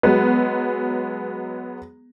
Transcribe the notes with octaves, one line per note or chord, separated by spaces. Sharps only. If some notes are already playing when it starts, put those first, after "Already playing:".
F#3 G#3 B3